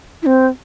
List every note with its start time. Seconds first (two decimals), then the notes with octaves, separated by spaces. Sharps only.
0.22 E4
0.26 C4